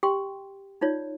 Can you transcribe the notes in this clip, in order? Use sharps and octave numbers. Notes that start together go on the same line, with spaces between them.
G4 G5 C6
D#4 F4 C#5 D5